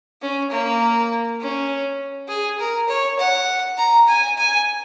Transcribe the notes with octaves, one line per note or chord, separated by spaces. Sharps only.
C#4
A#3
C#4
G#4
A#4
C#5
F#5
A#5
G#5
G#5